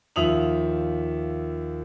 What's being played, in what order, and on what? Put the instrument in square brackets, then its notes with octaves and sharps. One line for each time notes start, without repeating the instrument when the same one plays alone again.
[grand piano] D#2 F3 E5 D#6 F7 F#7